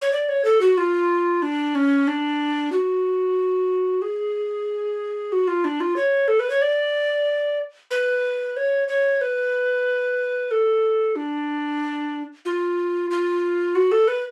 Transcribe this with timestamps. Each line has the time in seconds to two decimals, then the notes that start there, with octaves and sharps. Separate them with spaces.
0.02 C#5
0.13 D5
0.29 C#5
0.45 A4
0.61 F#4
0.78 F4
1.42 D4
1.75 C#4
2.07 D4
2.72 F#4
4.02 G#4
5.32 F#4
5.48 F4
5.65 D4
5.80 F4
5.96 C#5
6.28 A4
6.39 B4
6.50 C#5
6.62 D5
7.91 B4
8.57 C#5
8.88 C#5
9.21 B4
10.51 A4
11.16 D4
12.45 F4
13.11 F4
13.75 F#4
13.92 A4
14.08 B4